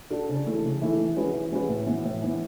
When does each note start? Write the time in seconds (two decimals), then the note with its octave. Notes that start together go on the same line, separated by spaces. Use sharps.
0.10 D4 F#4 A4 D5
0.29 C#3
0.46 E3 A3 E4 A4
0.64 C#3
0.82 E3 A3 E4 A4
0.98 E3
1.16 G#3 C#4 F#4 B4
1.33 E3
1.51 G#3 C#4 F#4 B4
1.68 A2
1.86 E3 B3
2.04 A2
2.22 E3 B3